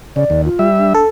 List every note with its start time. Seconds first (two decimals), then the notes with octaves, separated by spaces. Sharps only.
0.16 C#3 D5
0.30 D#2
0.45 F4
0.59 G3 E5
0.78 D4
0.94 A4